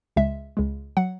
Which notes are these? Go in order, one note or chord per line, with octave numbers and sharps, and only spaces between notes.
C#2 C#3 G#3 E5
C#2 C#3 G#3
F#3 F#5